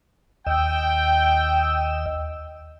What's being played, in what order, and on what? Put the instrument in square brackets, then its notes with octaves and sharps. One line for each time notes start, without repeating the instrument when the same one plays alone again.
[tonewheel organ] D#2 D#5 E6 [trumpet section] G5